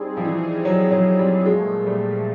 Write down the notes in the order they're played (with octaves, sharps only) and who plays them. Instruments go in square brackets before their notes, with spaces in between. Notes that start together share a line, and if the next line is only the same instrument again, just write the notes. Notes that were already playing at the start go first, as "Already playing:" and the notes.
Already playing: [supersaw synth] G3 C4 D#4 G#4
[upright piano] F3
E3
F#3
F#3
G3
[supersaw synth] A#2 F3 A3 [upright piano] G#3
[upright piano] G3